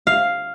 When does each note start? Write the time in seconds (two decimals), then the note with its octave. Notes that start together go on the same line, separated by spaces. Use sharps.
0.07 F5